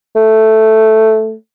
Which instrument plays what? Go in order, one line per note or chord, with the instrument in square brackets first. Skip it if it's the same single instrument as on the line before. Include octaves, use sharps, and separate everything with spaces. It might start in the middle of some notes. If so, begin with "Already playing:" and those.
[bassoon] A3